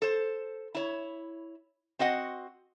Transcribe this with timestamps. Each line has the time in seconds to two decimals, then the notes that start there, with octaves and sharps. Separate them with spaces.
0.02 A4 C5
0.75 E4 C#5
1.99 C4 F#4 D#5 F#5